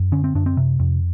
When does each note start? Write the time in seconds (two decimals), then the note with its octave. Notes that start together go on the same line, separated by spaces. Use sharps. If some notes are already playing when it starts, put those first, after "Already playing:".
Already playing: F#2
0.12 D3 C#4
0.24 C4
0.35 F#2 D4
0.46 C4
0.57 C3
0.79 F2